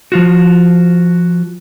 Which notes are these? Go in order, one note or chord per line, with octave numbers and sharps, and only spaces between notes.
F3 F4 F#4